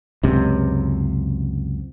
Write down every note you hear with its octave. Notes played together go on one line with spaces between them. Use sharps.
C#2 F#2 C3